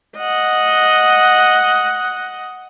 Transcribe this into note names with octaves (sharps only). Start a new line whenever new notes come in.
D#5 F#5